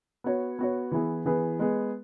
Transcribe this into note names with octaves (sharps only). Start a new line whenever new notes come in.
B3 F#4 C#5
B3 F#4 C#5
E3 B3 E4 G#4 B4
E3 B3 E4 G#4 B4
G#3 B3 G#4